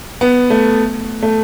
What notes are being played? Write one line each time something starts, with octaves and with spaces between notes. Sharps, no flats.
B3
A3
A3